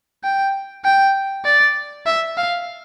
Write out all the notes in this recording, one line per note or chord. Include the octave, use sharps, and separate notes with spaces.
G5
G5
D5
E5
F5